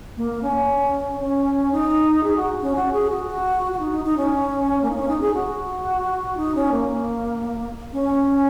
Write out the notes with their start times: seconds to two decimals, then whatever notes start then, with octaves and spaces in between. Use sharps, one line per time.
0.17 A#3
0.42 C#4
1.20 C#4
1.72 D#4
2.23 G#4
2.36 F#4
2.62 C#4
2.76 F#4
2.92 G#4
3.10 F#4
3.27 F#4
3.72 F#4
3.79 D#4
3.92 D#4
4.05 D#4
4.17 C#4
4.82 A#3
4.90 D#4
4.95 C#4
5.08 D#4
5.21 G#4
5.34 F#4
6.37 D#4
6.55 C#4
6.72 A#3
7.93 C#4